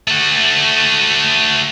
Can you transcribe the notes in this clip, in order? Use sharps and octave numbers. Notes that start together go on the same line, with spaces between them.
A3 F#4